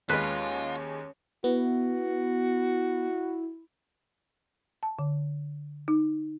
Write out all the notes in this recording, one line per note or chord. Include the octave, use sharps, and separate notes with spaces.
D#2 G#3 C#4 F4 B4
B3 E4 F#4
A5
D3
D#4